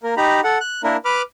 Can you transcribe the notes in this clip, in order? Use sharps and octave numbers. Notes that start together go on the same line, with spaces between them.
A#3 A#4
D#4 G4 A#5 B5
A4 F#5
F#6
A#3 D4 E4 A#4
B4 B5 D6 F6